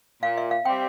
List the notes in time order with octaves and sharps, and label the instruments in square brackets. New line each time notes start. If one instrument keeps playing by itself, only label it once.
[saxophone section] A#2 [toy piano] F5
[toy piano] E5
F5
[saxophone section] G3 C4 [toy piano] G5